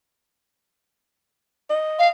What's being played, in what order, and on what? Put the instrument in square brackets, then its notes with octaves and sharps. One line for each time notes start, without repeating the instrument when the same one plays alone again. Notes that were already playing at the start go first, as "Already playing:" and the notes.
[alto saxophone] D#5
[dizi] F5